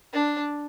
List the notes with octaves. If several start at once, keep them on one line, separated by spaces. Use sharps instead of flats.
D4